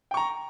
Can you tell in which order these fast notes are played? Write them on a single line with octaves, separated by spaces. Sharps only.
G5 C#6 A#5